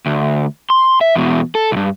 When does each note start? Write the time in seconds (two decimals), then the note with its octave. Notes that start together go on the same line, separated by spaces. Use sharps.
0.06 D2
0.70 C6
1.01 E5
1.16 E2 B2
1.55 A4
1.72 C2 G2